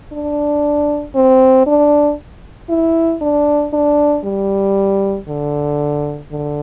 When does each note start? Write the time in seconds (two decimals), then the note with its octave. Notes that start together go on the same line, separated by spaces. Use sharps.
0.13 D4
1.15 C4
1.67 D4
2.70 E4
3.21 D4
3.73 D4
4.24 G3
5.29 D3
6.31 D3